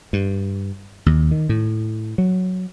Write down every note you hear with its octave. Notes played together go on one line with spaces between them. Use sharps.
G2
D#2
D#3
A2
F#3